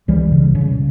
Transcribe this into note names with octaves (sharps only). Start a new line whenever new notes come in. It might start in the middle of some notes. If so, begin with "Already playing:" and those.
C#2 E3 G3
C#3
C#3